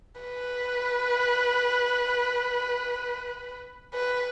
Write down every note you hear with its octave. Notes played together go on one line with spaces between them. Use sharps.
B4
B4